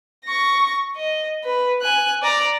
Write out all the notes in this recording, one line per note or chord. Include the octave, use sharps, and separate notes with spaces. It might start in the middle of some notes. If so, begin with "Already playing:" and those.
C#6 A#6
D#5
B4
G#5 F#6
D5 A#5